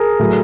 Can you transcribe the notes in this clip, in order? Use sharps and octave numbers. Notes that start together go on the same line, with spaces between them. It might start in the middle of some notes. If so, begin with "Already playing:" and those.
Already playing: G#4 A#4
A2 F#3